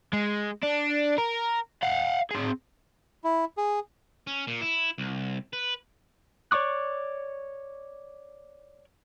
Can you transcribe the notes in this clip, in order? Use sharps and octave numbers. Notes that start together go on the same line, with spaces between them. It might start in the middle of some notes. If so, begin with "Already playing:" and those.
G#3
D4
A#4
F5 F#5
C4 G#4
E4
G#4
C#4
A#2
E4
C2
B4
C#5 D5 C#6 D6 F#6